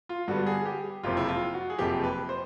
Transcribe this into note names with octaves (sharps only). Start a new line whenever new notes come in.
F4
G2 D3 G3 B3 F#4
G#4
G4
F#1 F2 C3 F3 F4
E4
F4
F#4
G#4
F#1 F2 C3 F3 G4
B4
C5